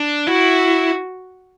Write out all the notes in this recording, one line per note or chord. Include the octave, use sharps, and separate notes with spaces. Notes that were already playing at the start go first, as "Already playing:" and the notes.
Already playing: D4
E4 F#4